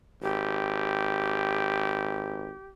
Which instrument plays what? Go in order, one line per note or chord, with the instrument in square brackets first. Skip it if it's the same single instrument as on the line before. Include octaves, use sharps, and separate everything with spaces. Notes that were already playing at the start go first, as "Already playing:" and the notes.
[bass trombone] G#1 [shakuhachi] G4